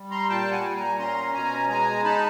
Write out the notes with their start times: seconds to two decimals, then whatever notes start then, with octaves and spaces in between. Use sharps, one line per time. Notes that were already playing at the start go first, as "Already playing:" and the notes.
Already playing: G3
0.11 A#5 C6
0.29 A#2 G5 A5
0.52 F#5 G#5
0.63 A#2
0.76 G#5 A#5
0.99 C#4 A#5 C6
1.34 B2 G#5 A#5
1.69 G#3 G#5 A#5
2.04 D#4 A5 B5